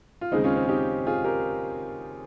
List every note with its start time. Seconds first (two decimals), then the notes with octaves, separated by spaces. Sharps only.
0.21 F4
0.32 D#2 C#3 G#3 C4 D#4
0.44 C#4 F4
0.56 C4
0.69 D#4 G4
1.07 F4 G#4
1.24 G4 A#4